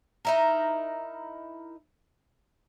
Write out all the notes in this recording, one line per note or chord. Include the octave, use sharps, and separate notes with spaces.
D#4 E4 A#4